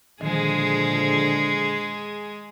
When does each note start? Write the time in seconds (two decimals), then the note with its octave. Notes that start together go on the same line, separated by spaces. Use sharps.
0.21 A#2 D3 D#3 F3 G#3 G#4